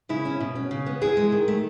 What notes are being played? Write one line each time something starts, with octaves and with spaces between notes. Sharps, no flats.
C#3 E4
C#4
B2
C#4
C#3
B3
E2 E4 G#4
G#3
D#3
A3